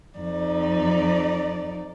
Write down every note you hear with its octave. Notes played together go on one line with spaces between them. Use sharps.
F2 D#4 D5